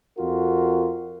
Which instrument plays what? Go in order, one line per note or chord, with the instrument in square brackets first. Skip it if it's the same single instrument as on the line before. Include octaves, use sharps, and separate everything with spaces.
[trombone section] F2 F4 F#4 A#4